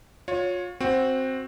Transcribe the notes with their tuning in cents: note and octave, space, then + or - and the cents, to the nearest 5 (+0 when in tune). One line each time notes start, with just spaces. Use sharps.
F4 +35 C#5 +0
C4 +5 F#4 -5